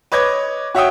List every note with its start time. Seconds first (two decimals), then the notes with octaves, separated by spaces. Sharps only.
0.12 B4 C#5 D#5 D6 G#6
0.75 F#4 C#5 E5 F#5 G5 D#6